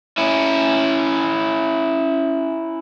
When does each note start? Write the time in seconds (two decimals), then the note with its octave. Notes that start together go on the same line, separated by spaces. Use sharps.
0.18 C#4 E4